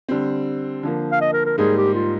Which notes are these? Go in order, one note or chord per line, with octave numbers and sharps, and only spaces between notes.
D3 G3 C4
D3 F3 A#3
F5
D#5
A#4
A#4
G#2 G3 A#3 D#4 G#4
G4
F4